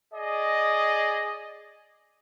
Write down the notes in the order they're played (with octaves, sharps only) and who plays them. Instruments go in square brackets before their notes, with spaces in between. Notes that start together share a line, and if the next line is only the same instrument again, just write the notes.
[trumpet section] G#4 D5 D#5